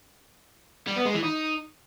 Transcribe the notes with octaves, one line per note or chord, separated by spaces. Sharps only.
G3
B3
G#3
E3
D#4